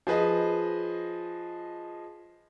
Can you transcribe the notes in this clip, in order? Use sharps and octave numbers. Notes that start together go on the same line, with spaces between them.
F3 G#4 B4 D#5